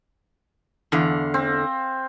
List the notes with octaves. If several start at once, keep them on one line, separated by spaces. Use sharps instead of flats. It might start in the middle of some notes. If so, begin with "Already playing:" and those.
E2 D3 F5
C4